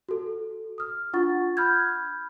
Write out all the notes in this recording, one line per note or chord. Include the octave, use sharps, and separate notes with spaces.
F#4 A4
D#6 F6
D4 F4 F#5 C#6 A6
B5 F6 G6 G#6